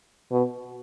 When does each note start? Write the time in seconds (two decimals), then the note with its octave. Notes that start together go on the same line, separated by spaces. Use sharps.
0.31 B2